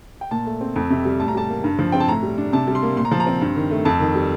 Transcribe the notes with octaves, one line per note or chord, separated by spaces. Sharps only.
G5
A#2 A5
A3
C4
F2
C3
G3
A2 A5
A#5
G3 A5
A#3
G2
F3
C4 G5
A5
A2 A#5
G3
D4
C3 A5
G3
C6
A#3
A#2 C6
A#5
F3 A5
A#5
C4
G2
D#3
A3
F2 A5
D#3
G3